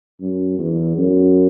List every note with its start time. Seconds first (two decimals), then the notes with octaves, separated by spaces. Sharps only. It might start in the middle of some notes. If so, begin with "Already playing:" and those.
0.20 F#2
0.59 E2
0.98 F#2